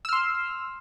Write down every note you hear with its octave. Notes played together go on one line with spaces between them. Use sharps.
C6 E6 F6